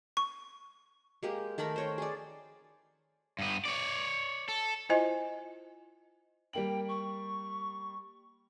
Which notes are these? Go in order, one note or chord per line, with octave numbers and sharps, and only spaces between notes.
C#6
G#3 A#3 G4
D#3 A3 A#4 B5
C5 C#5 G5
G#4 D5
G2 B3
C#5 D5
A4
E4 F4 C5 D#5 G#5
G3 A#3 G5 F#7
C#6